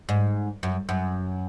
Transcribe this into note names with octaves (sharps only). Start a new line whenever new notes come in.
G#2
F#2
F#2